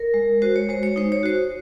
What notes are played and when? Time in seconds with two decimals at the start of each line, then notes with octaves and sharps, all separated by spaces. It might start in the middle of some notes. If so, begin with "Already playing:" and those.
Already playing: A#4
0.14 G#3
0.42 F#4 C5
0.56 C#5
0.69 G#3 C5
0.83 C#5
0.96 D#4 C5
1.12 C#5
1.23 F#4 C5